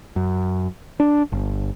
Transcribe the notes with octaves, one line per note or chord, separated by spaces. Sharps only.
F#2
D4
G1